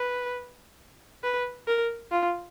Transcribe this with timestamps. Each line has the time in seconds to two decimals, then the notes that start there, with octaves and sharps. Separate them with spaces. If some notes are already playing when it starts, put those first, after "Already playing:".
Already playing: B4
1.23 B4
1.68 A#4
2.11 F4